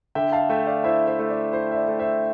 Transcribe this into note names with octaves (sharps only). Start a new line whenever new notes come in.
D3 E5 G5
F5 A5
A3 E5 G5
D5 F5
E4 C5 E5
C5 E5
A3
D5
E4 C5
E5
D5
A3
C5 E5